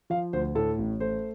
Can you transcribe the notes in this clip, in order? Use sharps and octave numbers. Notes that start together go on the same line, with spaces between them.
F3 F5
D2 C5
A2 A4
A1
A3 C5